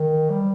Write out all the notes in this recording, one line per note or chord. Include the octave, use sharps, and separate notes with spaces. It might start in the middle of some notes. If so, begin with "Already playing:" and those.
Already playing: D#3
G3